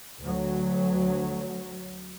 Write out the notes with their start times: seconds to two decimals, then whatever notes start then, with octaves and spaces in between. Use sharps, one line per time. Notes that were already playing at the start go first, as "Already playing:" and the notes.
0.22 D2 F#3